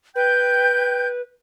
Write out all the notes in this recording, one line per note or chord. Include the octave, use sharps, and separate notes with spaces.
B4 G5 G6